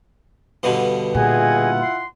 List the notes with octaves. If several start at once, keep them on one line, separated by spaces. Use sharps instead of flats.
G2 B2 D3
A#2 E4 F4 G#4 D#5 F#5 G#5
C6